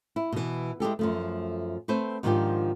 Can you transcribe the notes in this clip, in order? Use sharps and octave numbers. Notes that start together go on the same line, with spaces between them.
E4
B2 E3
G#3 E4 G4 A4
F#2 F3 A3
A3 C4 B4 C5
G#2 D#3 F3 D4 F4 G4